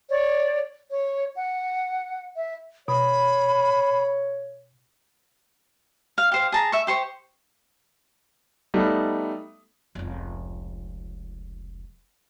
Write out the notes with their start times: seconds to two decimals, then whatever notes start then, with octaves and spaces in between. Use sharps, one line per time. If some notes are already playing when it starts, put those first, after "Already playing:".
0.09 C#5 D5
0.91 C#5
1.36 F#5
2.37 E5
2.88 B2 C#5 B5
6.18 F5
6.32 G4 C5 F5
6.52 G#4 A5 A#5
6.72 E5 C#6
6.87 G4 C5 C#6
8.74 G3 A3 B3 D#4
9.95 F1 C#2